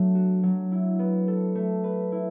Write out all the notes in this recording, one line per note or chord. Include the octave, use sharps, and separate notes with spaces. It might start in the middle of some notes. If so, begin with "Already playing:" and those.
Already playing: F#3 A3 D4
F#4
F#3
E4
B3
A4
A3
B4
E4